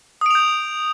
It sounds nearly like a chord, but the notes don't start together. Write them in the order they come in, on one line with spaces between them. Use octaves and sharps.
D#6 D7 F7 G6